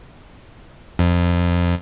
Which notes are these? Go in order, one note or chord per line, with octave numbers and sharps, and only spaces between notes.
F2